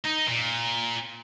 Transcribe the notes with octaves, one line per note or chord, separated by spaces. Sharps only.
D#4
A#2